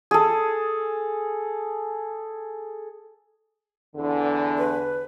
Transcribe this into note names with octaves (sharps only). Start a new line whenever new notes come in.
G#4 A4
E2 D3
B4